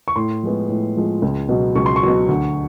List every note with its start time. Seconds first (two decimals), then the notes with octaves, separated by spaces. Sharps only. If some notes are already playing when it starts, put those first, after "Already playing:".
0.08 C#6
0.16 A2 C6
0.43 F3 G#3 B3
0.69 A2
0.97 F3 G#3 B3
1.22 C#2
1.49 B2 F#3
1.75 C#2 C#6
1.86 C6
1.96 C#6
2.03 B2 F#3
2.28 D2